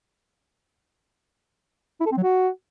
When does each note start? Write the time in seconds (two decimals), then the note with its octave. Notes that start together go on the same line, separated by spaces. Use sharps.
2.00 E4
2.06 A4
2.12 C4
2.17 F#3
2.23 F#4